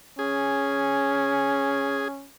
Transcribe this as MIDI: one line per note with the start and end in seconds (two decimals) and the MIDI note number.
0.19 2.29 61
0.19 2.08 68